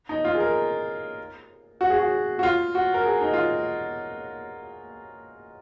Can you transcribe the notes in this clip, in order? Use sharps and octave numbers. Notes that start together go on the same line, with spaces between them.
D#4
F4
G#4
A#4
F#4
G#4
F#4
F#4
F4
F#4
A#4
G#4
D#4
F4